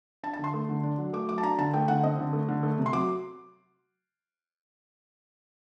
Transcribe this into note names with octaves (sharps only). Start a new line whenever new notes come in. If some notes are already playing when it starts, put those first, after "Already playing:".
D4 A5
A5
D3 C6
A3
D3
D4
F#3
A3 D6
F#3 D6
A5
D4 A#5
D3 A5
A3 G5
D3 F#5
C4 D#5
D3
A3
D3
A3
C3
C6
F#3 D6